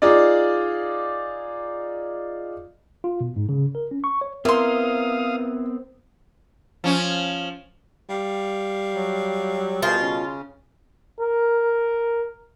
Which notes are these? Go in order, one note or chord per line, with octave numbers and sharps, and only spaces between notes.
D#4 F4 G#4 D5
F4
B2
G#2
C#3
A#4
C#4
C#6
C#5
B3 C4 E4 A#4 F5 C6 D#6
F3 C#4
G3 F5
F#3
B2 F4 G#4 A#4 C5
C#3 C#4
A#4